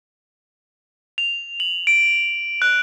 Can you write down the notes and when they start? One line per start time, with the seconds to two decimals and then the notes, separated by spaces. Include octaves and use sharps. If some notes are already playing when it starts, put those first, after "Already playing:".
1.18 F7
1.60 F#7
1.87 D7
2.62 F#6